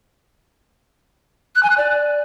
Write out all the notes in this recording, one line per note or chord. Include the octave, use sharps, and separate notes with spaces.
F#6
G#5
F#6
D5